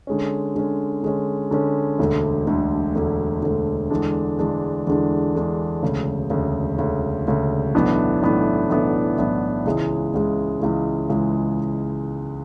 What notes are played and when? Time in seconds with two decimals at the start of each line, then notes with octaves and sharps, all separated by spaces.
0.07 D3 G#3 C#4
0.55 D3 G#3 C#4
1.03 D3 G#3 C#4
1.51 D3 G#3 C#4
1.98 E1 D2 D3
2.47 E1 D2 D3
2.95 E1 D2 D3
3.43 E1 D2 D3
3.90 E2 D3 G#3 D4
4.39 E2 D3 G#3 D4
4.87 E2 D3 G#3 D4
5.35 E2 D3 G#3 D4
5.82 E1 D2 C#3
6.30 E1 D2 C#3
6.78 E1 D2 C#3
7.27 E1 D2 C#3
7.75 B1 A2 E3 B3 D4
8.22 B1 A2 E3 B3 D4
8.70 B1 A2 E3 B3 D4
9.18 B1 A2 E3 B3 D4
9.65 C#2 C#3 E3 G#3
10.14 C#2 C#3 E3 G#3
10.61 C#2 C#3 E3 G#3
11.09 C#2 C#3 E3 G#3